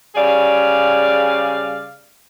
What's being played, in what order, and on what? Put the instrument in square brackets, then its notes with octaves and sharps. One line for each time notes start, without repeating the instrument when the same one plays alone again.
[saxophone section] C#3 G3 G#4 D5 F5